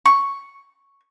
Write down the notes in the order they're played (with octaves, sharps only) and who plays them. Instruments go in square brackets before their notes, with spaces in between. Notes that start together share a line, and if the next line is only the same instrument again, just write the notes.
[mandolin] C#6